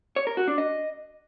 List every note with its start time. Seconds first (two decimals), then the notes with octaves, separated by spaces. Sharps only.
0.16 C#5
0.27 A#4
0.37 F#4
0.48 D4
0.58 D#5